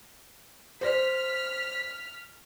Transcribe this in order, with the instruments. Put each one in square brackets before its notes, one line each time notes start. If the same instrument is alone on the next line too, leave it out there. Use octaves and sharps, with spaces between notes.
[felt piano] C5 D5 [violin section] F6 B6